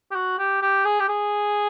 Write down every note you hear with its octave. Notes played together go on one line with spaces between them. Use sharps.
G4
F#4
G4
G4
G#4
G4
G#4